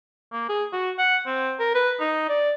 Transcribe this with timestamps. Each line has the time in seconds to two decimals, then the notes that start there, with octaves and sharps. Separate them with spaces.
0.32 A#3
0.49 G#4
0.73 F#4
0.98 F#5
1.26 C4
1.59 A#4
1.75 B4
2.00 D#4
2.29 D5